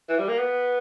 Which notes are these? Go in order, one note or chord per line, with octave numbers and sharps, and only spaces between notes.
E3
G3
A#3
B3